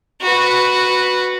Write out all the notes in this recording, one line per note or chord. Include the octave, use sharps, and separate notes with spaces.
F#4 B4